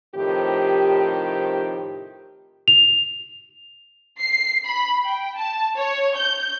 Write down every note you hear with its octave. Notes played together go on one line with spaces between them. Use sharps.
A2 C3 D#3 F3 G4
F7
C7
B5
G5
A5
C#5
G6